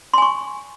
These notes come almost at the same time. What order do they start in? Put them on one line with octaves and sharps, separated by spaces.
C6 G#5 C#6